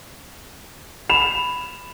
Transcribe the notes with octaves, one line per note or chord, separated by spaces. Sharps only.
B5 E7 F7